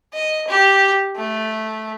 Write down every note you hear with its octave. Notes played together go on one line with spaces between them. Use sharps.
D#5
G4
A3